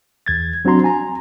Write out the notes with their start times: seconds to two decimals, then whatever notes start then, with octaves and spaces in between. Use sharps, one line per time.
0.26 E2 G#6 A6
0.65 F#3 C4 D4 F#4 A#5 C6
0.84 G#5 A#5